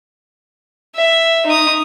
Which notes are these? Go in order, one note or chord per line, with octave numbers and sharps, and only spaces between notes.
E5
D#4 D#6